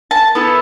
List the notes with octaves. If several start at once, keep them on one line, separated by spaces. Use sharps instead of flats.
A5
B3 E4 A4